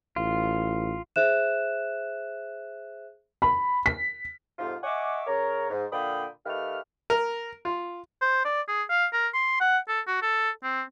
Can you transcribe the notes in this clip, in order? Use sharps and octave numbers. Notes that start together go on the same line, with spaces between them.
A1 F4
G#4 C5 E5 F#6 E7
B5
B6
F2 G#2 C3 F4
D#5 E5 F#5 G#5 C#6 D6
C#3 A#4 C#5
G#2
A#2 D3 F5 G5 B5 D#6
D#3 A3 G4 B4 F5 F6
A#4
F4
C5
D5
G#4
F5
A#4
C6
F#5
A4
F#4
A4
C4